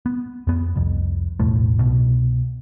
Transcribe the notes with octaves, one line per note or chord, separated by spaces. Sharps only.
B3
F2 B3
C2 F2
B1 E2 A2 A3
C2 B2